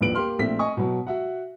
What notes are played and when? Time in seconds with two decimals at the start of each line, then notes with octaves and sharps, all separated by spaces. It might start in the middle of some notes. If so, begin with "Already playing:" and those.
0.01 D#1 A#1 F3 B4 D7 F#7
0.15 A#3 G4 C6 F6
0.39 A#1 A3 C4 B6
0.59 D#5 G#5 C#6 D#6
0.77 B2 F#3
1.07 F#4 E5 F#5